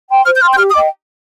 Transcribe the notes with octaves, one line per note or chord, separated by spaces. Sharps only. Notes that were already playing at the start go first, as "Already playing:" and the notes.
G5 C6
C5 F6
G6
G5 C6 F6
G6
G4 F6
D#6
D#5 G5 D6